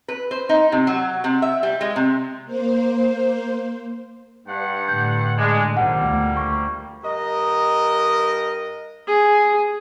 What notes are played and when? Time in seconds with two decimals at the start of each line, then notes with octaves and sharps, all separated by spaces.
0.08 B4
0.31 C5
0.49 D#4
0.72 C3
0.87 F#3
1.24 C3
1.42 E5
1.63 G3
1.81 G#3
1.96 C3
2.45 A#3 C5
4.47 G2 F#5
4.88 A2 D3 G6
5.37 G#3 D4
5.77 B1 D#3 F3 G3 A#3 F#5
6.06 D2 A3
6.37 C#6
7.03 G2 A#4 D#5
9.07 G#4